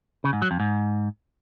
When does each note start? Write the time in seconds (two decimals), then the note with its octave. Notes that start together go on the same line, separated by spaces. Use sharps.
0.24 C#3
0.33 G#2
0.42 F#3
0.51 F2
0.60 G#2